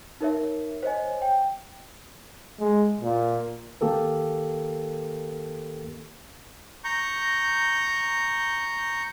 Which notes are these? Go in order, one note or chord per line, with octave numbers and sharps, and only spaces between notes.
D#4 A#4 C#5 E5
C5 C#5 D#5 G#5
G5
G#3
A#2
D#3 A#3 G4 A4 A#4
A#5 C#6 G6